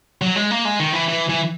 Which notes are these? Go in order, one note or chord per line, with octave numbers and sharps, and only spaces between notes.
F#3
G#3
A#3
G#3
D#3
E3
E3
E3